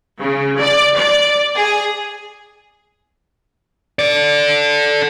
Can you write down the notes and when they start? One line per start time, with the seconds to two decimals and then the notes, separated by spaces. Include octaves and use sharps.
0.21 C#3
0.59 D5
0.97 D5
1.56 G#4
3.99 A4 D5